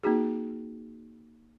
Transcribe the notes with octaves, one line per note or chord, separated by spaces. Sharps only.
A#3 C4 D#4 F#4 G#4